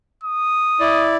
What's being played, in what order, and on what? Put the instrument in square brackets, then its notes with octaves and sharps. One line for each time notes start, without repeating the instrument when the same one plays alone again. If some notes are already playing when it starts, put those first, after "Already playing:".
[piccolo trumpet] D#6
[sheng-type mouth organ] E4 D5